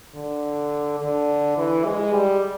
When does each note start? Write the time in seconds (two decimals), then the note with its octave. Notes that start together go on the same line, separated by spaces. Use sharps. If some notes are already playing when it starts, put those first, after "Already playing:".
0.15 D3
1.00 D3
1.57 E3
1.85 G#3
2.14 G3